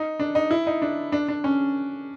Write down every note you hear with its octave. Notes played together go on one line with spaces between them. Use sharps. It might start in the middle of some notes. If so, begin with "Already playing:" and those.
Already playing: D#4
D4
D#4
E4
D#4
D4
D4
D4
C#4